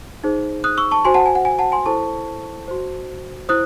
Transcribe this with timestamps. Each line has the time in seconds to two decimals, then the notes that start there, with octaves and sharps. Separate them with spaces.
0.24 D#4 G#4 C5
0.64 D#6 F#6
0.77 C#6 E6
0.91 A5 C#6
1.05 F#4 C5 G#5 C6
1.14 F#5 A5
1.26 G#5
1.35 F#5
1.45 G#5
1.59 F#5 A5
1.72 G#5 C6
1.86 E4 A4 C5 A5 C#6
2.68 F#4 C5
3.49 E4 C5 D#6 F#6